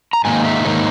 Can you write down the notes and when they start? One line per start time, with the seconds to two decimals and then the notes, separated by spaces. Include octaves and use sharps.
0.13 A#5
0.25 G#2 D#3 A#3 D#4 G#5
0.45 E5
0.65 G#2 D#3 A#3 D#4 C#5